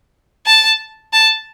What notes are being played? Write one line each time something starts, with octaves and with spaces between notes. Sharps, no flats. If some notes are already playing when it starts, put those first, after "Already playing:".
A5
A5